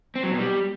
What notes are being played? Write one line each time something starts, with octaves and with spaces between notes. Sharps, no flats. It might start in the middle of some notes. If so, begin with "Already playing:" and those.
C4
F#3
B2
G3